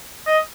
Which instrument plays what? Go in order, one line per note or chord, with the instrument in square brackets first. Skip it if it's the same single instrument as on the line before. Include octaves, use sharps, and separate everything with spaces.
[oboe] D#5